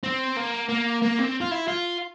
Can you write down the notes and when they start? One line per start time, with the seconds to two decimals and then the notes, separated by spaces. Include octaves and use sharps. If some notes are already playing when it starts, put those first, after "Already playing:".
0.04 C4
0.37 A#3
0.70 A#3
1.02 A#3
1.19 C4
1.41 F4
1.51 E4
1.68 F4